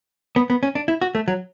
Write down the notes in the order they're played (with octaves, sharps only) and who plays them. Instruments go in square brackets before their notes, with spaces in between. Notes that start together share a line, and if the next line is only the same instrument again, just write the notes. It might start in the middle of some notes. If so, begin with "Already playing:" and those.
[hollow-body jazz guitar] B3
B3
C#4
D4
E4
F#4
A3
F#3